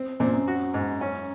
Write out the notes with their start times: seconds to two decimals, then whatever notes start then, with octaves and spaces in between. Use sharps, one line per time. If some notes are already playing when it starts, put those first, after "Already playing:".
Already playing: C4
0.20 F#2 A#2 C4
0.33 F#2
0.48 F#4
0.74 G#2
1.01 C#4